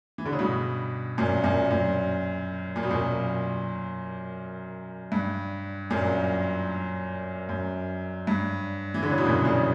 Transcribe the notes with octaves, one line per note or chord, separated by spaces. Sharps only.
E3
D3
C#3
G2 B2
F#2 A#2
F#2 A#2
F#2 A#2
A#2
B2
F#2 A#2
G2
F#2 A#2
F#2
G2
E3
D3
C#3
B2
F#2 A#2
A#2 C#3